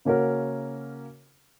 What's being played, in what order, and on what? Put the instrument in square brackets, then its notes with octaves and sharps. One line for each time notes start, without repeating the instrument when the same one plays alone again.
[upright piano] C#3 A#3 C#4 F#4 A#4